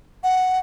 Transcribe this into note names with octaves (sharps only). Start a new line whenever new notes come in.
F#5